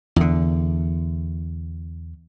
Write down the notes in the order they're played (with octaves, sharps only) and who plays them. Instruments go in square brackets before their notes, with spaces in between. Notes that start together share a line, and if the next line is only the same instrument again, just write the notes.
[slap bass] E2 D3